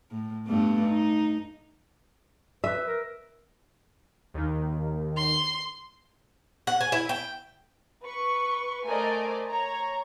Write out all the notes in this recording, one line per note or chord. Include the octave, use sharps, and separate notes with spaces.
A2
G2 A3 B3
D#4
B4 E5
A#4
D#2 D#3
C6
F#5
G#5
E4
G5
B4 C#6
A3 A#4 C5 D5 D#5 G#5
C#5 A#5